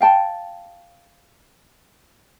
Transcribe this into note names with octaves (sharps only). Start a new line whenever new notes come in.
F5 G5 A5